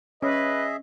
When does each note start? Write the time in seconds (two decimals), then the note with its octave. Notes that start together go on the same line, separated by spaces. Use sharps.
0.22 C#4 G#4 B4 D#5 E5